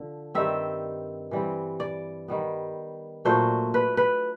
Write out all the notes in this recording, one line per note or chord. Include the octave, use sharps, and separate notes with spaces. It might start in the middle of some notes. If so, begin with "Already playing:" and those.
Already playing: D3 F3
G2 D#3 G3 C4 E5
E3 G3 C4
D5
D#3 G3 B3
A#2 F#3 A3 D4 C5
B4
B4